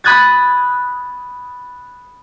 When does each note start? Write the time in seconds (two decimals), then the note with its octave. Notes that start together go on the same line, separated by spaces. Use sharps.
0.04 B5 D#6 F#6 G#6 A6